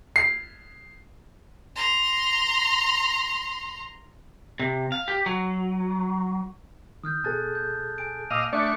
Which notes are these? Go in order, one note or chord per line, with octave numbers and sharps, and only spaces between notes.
C7
A#5 C6
C3
F5
G4
F#3
D#3 D#6 F6 G6
B2 G#4 A4 A5 F#6 A6
G6
G#5 D7
A#2 D#5 F5 D6 E6
A3 D4 D5 E5 C#6 D#6 F6 F#6